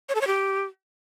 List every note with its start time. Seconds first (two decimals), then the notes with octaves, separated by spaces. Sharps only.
0.09 C#5
0.15 A4
0.21 C#5
0.27 G4